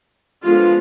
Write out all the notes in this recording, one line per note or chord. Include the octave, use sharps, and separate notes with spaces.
D3 F3 G#3 B3 F4